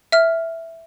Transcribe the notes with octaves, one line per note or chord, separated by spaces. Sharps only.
E5 F6